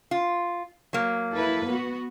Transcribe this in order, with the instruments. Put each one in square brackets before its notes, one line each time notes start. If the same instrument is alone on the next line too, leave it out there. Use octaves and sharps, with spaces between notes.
[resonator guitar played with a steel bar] F4
F#3 A#3
[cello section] E4 A4 B4
B3 F#4